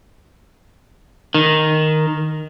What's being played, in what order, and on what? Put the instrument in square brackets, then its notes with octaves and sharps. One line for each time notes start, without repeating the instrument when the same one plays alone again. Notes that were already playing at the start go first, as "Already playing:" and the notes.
[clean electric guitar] D#3